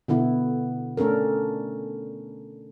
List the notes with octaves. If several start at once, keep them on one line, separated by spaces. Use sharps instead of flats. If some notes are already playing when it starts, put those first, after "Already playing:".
B2 D3 B3 E4
A3 C#4 D4 A4 A#4